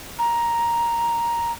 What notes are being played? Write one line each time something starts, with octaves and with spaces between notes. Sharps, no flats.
A#5